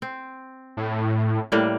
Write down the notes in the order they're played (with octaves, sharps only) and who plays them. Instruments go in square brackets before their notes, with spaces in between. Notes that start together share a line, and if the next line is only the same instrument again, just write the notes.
[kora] C4
[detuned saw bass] A2
[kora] A2 G3 A#3